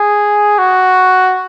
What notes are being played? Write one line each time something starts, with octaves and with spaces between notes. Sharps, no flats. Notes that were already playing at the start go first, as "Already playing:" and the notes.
Already playing: G#4
F#4